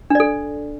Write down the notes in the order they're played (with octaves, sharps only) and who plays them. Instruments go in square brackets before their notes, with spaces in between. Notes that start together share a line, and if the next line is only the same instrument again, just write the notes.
[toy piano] D4
D5
A4